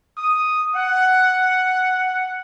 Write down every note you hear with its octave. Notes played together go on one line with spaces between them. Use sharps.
D#6
F#5